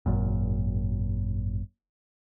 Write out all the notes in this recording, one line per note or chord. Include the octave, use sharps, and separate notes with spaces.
G#1 F#2 A#2